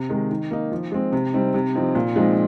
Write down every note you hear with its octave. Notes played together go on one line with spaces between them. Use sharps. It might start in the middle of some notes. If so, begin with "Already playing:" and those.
Already playing: C3
D#3 G#3 D#4
D#3
A#3 D#4
F3
G#3 C4
C3
G3 C4 D#4
C3
F3 C4 D#4
A#2
F3 G#3 C4 D#4